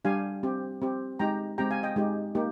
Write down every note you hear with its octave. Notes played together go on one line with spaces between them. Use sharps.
G3 D4 G4 F5 G#5
C4 G4
C4 G4
G#3 D#4 G4 G5 A#5
G#3 C4 G4 G5 A#5
F5 G#5
D#5 G5
G#3 D#4 G4
A#3 D#4 G4